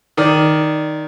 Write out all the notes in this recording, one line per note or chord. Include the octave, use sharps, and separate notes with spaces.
D#3 D5